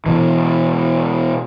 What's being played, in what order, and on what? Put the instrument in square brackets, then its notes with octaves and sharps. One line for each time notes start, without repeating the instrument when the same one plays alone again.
[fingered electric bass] B2 E3